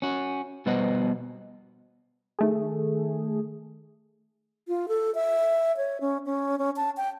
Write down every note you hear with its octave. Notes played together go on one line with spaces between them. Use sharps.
C#4 F#4
B2 G3 B3 C5 D#5 F#5
D#3 A3 G#4
F4
A4
E5
C#5
C#4
C#4
C#4
A5
G5